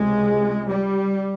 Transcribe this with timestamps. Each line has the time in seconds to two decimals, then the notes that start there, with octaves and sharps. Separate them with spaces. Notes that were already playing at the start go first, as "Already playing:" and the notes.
Already playing: C#2 C3 G#3
0.69 G3